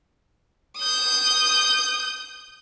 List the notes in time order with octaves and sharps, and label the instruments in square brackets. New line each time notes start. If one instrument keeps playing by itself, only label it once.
[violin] D#6 G6